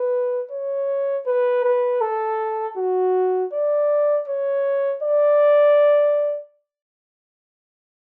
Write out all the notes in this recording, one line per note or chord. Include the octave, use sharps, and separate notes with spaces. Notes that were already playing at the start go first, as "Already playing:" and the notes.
Already playing: B4
C#5
B4
B4
A4
F#4
D5
C#5
D5